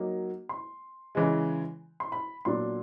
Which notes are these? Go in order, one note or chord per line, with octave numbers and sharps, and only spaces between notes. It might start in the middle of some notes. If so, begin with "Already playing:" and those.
Already playing: F#3 A#3 D#4
C6
C#3 E3 G#3
C6
B5
A#2 F#3 B3 D4 C6